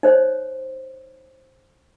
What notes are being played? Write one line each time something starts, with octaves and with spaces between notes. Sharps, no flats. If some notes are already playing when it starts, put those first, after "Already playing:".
D#4 C5 C#5